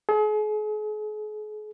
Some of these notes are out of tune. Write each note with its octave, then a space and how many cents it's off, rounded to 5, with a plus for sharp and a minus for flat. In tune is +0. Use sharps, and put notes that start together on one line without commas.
G#4 +40